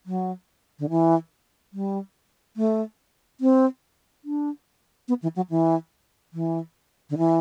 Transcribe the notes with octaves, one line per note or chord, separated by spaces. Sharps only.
F#3
D3
E3
G3
A3
C4
D4
B3
E3
F#3
E3
E3
D3
E3